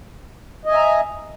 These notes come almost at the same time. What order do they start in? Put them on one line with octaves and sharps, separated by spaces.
D#5 G#5 E5 A#5